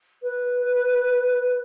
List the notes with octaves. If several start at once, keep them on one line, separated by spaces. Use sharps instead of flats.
B4